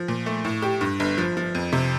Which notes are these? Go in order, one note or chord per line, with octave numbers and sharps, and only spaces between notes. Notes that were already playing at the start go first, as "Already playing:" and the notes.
Already playing: F3
A#2
A3
A2
G4
G2
G1
F3
F3
F2
C3